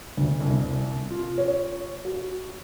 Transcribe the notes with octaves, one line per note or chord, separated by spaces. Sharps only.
D2
C2
C2
F4
C#5
F#4